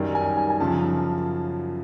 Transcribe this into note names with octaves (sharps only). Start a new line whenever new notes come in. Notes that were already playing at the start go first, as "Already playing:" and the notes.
Already playing: F#2 D#3 G3
G#5
G#5
G#5
F#2 C#3 F3 A5